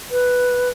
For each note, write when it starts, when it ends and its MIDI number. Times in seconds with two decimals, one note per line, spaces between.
0.11 0.70 71